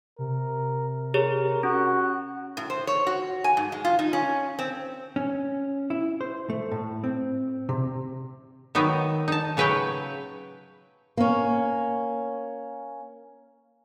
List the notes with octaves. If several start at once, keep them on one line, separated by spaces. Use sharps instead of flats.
C3 A#4
G4 G#4 A#4 C#5
C#4 F#4 F#6
A2
C5
C#5
F#4
G#5
G#2
G#3
F4
D#4
C#4
C4
C#4
E4
C5
A3
A2
C4
C3
D#3 F#3 B3 D#4
D#4 A5
C#3 F#3 B4 C#5 G5
A#3 C#4